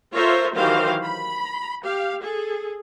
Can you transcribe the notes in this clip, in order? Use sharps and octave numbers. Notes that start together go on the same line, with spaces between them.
F4 A4 A#4 C5 C#5 E5
D#3 E3 F#3 G4 C5 F5
B5
G4 F5
G#4 A4